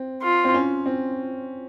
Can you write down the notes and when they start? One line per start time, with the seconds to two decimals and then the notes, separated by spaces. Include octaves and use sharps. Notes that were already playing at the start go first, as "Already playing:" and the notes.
Already playing: C4
0.23 F4
0.44 C4
0.54 C#4
0.86 C4